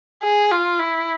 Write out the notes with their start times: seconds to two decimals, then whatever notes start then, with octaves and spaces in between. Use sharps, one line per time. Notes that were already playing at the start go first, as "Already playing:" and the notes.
0.23 G#4
0.52 F4
0.79 E4